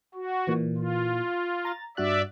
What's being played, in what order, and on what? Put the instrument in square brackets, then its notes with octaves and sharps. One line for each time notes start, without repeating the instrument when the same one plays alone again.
[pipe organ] F#4
[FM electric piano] A#2 E3
[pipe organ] F4
[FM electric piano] A#5 A6
[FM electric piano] G2 F#4 F#6 [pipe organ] D5 E5